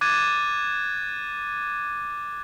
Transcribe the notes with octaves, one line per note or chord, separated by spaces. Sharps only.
D6 F#6 G#6 A6 D#7